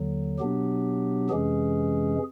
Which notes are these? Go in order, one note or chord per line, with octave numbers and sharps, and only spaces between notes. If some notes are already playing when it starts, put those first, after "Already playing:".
Already playing: D#2 D3 F#3
B2 F#3 B3 D4 G4
F2 C3 E3 G#3 C#4 G#4